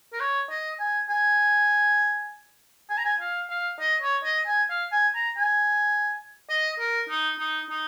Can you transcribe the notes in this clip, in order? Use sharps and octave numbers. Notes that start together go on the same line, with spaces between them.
A#4
C#5
D#5
G#5
G#5
G#5
A#5
G#5
F5
F5
D#5
C#5
D#5
G#5
F5
G#5
A#5
G#5
D#5
A#4
D#4
D#4
D#4